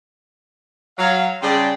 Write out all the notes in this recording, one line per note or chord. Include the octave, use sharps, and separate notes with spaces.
F#3 F5
C#3 G3 G#4 D5 A5 C6